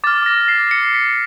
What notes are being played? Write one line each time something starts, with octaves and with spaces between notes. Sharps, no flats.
D6 F6 A6
A#6
C7
C#7
B6